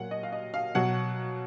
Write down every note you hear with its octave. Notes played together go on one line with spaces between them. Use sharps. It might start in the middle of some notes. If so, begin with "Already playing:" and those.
Already playing: A#2 F#3 F#5
D#5
F5
D#5
F5
B2 F#3 F#5